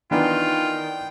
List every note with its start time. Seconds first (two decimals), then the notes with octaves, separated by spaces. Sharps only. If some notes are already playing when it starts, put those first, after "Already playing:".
0.11 D#3 E3 B3 D4 F4 G5